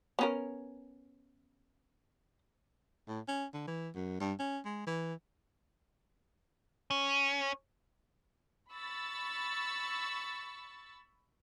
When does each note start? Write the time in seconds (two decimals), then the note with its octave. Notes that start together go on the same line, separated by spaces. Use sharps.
0.19 B3 C#4 A#4
3.08 A2
3.28 C#4
3.53 D3
3.67 E3
3.95 F#2
4.20 G2
4.39 C#4
4.65 G#3
4.87 E3
6.91 C#4
8.71 B5 C#6 E6 A6